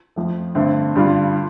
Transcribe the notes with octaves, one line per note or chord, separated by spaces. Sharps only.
F2 F3 A3
G2 D3 A3 C4
G2 D3 G3 F4
F4